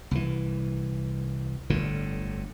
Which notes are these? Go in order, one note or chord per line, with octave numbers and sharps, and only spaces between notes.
C2 E3
G1 A2 D3